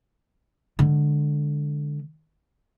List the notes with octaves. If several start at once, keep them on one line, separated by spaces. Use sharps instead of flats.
D3 G#3